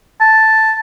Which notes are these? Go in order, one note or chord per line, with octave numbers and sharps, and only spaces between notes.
A5